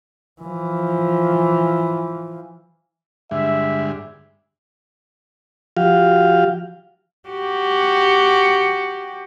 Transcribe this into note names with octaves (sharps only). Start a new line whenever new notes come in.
E3 F3
G2 D3 G#3 E5
F3 F#4 G4 F5
F#4 G4